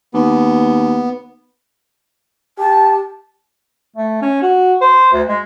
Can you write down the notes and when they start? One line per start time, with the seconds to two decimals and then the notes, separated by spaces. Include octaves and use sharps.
0.14 D#2 B3
2.59 G4 A5
3.96 A3
4.22 C#4
4.42 F#4
4.81 C5
5.13 D2
5.28 G#3